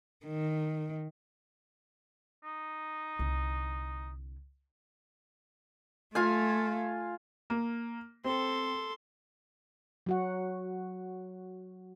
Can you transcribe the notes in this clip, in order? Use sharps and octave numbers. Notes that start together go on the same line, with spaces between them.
D#3
D#4
C2 D3
A3 F4 F5 G#5
A#3
C4 A4 C6
F#3 F#4 F#5